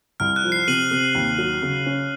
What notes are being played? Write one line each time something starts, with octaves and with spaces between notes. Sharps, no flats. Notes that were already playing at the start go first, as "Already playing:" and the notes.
C2 F6
F#6
F3
C7
C3 D#7 F#7
C3
D#2
F#3
C#3
C#4